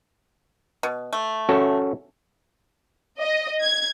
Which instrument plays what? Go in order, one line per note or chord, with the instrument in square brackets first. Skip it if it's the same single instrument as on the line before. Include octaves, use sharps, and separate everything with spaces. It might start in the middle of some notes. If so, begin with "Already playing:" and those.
[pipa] B2
A3
[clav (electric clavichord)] C#4 F#4 A4
[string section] D#5
G#6